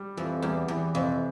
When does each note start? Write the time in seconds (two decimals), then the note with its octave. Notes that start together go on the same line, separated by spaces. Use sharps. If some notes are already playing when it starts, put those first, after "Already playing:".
Already playing: G3
0.17 F2 E3
0.42 E2 G3
0.68 E2 E3
0.94 F2 C3